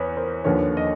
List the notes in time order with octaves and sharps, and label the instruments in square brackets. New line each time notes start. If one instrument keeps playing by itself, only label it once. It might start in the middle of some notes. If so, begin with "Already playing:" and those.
Already playing: [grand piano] E2 B4 C#5
A#4 C5
D#2 D3 F3 B4 C#5
D#5